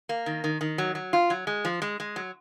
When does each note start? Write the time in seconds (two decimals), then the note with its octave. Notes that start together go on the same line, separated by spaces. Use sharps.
0.09 A#3
0.26 D#3
0.44 D#3
0.61 D#3
0.78 F#3
0.95 F#3
1.13 F4
1.30 F#3
1.47 G#3
1.65 F3
1.82 G#3
2.00 G#3
2.16 F#3